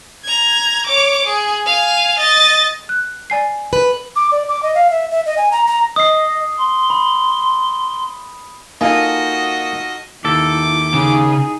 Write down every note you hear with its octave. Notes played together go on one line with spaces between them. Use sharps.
A#5 G#6
C#5 D6
G#4
F5 G#5
D#5 A6
F#6
D5 G#5 C7
B4
D6
D5
D6
D#5
F5
E5
E5
D#5
G#5
A#5
A#5
D#5 D#6 C7
C6
B5
A#3 D#4 F4 F#4 A4 D#5 G#5
D#2 E4 A4 D6
C#3 D#4 G#4